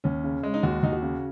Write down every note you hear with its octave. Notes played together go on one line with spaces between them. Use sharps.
D#2 C#4
C#3
G#3
D#4
D#2 F#4
D#2 D#4
F#4
C#3